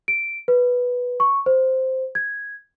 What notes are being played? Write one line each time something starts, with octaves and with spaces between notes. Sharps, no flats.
D7
B4
C#6
C5
G#6